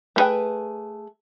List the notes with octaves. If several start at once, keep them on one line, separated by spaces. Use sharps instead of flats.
A3 C4 G#4 B4 G5